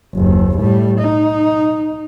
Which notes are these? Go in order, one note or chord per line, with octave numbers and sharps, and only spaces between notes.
F#1 D#2
A2 G3
D#4